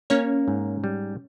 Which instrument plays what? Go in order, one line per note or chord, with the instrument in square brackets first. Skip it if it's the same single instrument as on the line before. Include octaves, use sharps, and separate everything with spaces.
[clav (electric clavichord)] A#3 [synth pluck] C#4 C#5
[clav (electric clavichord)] G#2
G3